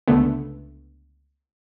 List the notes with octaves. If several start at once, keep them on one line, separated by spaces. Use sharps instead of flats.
C#2 D3 A3 B3